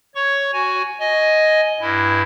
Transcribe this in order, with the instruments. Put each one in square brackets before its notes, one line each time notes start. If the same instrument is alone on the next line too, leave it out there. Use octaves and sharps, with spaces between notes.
[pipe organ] C#5 C#6
F#4 G#5
D#5 G#5
G2 E4